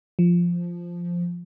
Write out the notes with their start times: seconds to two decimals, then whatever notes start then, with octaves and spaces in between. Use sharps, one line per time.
0.19 F3